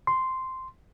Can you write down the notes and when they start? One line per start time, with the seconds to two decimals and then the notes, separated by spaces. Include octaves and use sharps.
0.07 C6